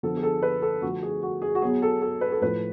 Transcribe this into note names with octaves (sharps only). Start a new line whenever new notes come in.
D3 F3 B3 A4
G#4
A4
B4
A4
D3 F3 A3 F#4
G#4
F#4
G#4
F#4
B2 F#3 B3 G#4
A4
A4
B4
A4
A2 F3 A3 B4